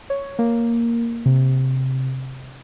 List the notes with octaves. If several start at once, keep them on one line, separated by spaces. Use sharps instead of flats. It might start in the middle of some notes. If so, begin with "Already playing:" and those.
C#5
A#3
C3